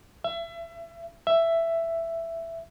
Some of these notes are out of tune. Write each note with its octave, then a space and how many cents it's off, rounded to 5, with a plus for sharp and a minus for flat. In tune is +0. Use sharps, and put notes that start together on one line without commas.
E5 +30
E5 +10